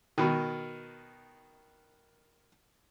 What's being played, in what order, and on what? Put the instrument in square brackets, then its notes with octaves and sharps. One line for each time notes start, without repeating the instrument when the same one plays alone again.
[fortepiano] B2 D#3